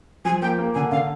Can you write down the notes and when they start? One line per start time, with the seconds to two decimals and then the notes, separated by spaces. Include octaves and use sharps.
0.25 F3 G#5
0.42 A#3 G5
0.58 A#3
0.75 D3 G#5
0.91 D3 F5